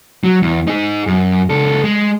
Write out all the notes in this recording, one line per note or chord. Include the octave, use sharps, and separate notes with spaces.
F#3
E2
D#4 G#4
F#2
C#2 A4
G#3